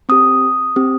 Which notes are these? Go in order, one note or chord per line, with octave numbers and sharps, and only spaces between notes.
C4 G4 D#6
C4 G4